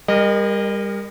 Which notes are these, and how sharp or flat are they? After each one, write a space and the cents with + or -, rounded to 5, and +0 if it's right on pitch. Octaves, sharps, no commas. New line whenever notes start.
G3 +35 A#4 +0 D#5 -25